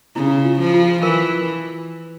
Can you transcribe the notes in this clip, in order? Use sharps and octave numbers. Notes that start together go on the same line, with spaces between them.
C#3 E4
F4
F3
F4
E3 A#4